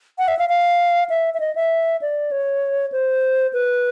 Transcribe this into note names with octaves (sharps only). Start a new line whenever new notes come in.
F#5
E5
F5
F5
E5
E5
D#5
E5
D5
C#5
C5
B4